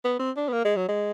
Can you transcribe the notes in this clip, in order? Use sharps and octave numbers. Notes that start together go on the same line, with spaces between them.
B3
C4
D4
B3
A#3
G#3
F#3
G#3